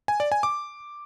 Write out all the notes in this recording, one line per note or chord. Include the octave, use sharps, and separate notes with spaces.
G#5
D5
G#5
D6